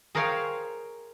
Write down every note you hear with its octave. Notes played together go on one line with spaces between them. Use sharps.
G#4 A#4 C5 C#5 F5 G5